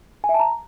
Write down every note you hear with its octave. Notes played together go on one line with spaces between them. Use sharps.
G#5
E5
A5
A#5